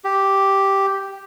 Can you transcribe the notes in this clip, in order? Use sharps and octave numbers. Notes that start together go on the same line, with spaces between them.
G4